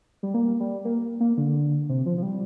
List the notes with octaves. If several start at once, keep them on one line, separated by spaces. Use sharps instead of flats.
G3
A#3
G3
A#3
A#3
D3
C3
F3
F3
G3